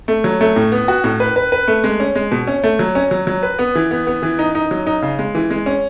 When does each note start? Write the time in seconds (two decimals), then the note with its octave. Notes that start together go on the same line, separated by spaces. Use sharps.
0.08 A3
0.24 F#3
0.41 A3
0.56 A2
0.72 B3
0.88 F#4
1.04 A2
1.20 B4
1.36 B4
1.52 B4
1.68 A3
1.84 G#3
2.00 C#4
2.15 G#3
2.32 B2
2.47 C#4
2.63 A3
2.79 F#3
2.95 C#4
3.11 F#3
3.27 F#3
3.43 B4
3.59 B3
3.75 E3
3.91 B3
4.07 B3
4.23 E3
4.39 D#4
4.55 D#4
4.71 F#3
4.87 D#4
5.02 C#3
5.19 G#3
5.35 E3
5.50 G#3
5.66 C#4